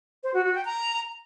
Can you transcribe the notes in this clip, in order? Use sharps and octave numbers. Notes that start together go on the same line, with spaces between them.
C5
F#4
F#4
G5
A#5